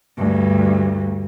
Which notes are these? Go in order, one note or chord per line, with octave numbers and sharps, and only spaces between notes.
D2 G2